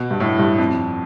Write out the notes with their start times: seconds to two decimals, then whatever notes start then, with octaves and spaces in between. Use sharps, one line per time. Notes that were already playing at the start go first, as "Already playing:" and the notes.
Already playing: B2
0.11 G2
0.20 A2
0.39 G2
0.58 F2